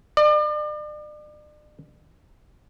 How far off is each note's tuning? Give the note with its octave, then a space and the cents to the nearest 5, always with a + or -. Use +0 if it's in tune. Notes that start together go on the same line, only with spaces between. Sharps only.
D5 +40